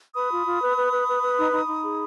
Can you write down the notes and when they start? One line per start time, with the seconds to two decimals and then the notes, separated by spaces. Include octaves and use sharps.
0.14 B4 B5 D#6
0.30 F4
0.46 F4
0.61 B4
0.77 B4
0.92 B4
1.07 B4
1.22 B4
1.38 D#4
1.53 D#4
1.68 D#4
1.84 G#4